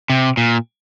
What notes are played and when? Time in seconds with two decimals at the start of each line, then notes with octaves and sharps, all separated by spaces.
0.10 C3
0.37 A#2